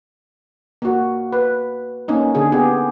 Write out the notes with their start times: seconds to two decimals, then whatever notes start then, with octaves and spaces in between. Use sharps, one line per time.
0.82 A#3 F#4
1.33 B4
2.08 A#3 C#4 D#4
2.35 D3 G#4
2.52 B3 G4 G#4